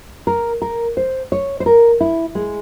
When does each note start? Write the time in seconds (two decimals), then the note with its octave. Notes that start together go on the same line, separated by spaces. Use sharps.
0.27 A#4
0.62 A#4
0.97 C5
1.32 C#5
1.60 C5
1.66 A#4
2.01 E4
2.35 G#3